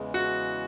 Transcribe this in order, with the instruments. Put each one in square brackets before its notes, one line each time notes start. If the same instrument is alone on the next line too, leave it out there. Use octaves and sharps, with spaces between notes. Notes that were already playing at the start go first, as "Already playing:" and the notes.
Already playing: [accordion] E2 C#3 E3 G#3
[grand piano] F#4